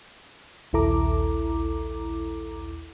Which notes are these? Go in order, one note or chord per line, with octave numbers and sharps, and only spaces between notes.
A#1 D#2 E4 A4 A#5 D6